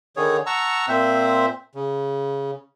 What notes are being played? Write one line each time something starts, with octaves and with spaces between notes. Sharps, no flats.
D3 D#3 G#4 C#5
F#5 A5 A#5 C#6 E6
A#2 C4 C5 E5
C#3